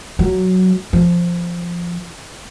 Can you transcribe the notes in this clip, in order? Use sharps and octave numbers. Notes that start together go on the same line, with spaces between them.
F#3
F3